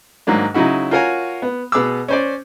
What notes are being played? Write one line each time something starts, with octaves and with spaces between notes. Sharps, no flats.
G#2 D#3 F#3 A#3 D4
C#3 F#3 D#4 E4 F#4
F4 F#4 A#4 C#5 G#5 A#5
B3
B2 B3 G#4 D6 E6
C#4 C5 D5